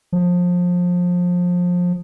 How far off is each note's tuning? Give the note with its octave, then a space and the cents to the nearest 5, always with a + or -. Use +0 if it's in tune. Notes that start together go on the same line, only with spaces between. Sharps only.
F3 +25